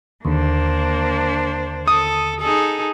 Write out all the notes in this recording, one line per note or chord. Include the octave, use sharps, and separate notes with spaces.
D#2 D3 A#3 D4 C5
A4 D#6
D#4 G#4 A4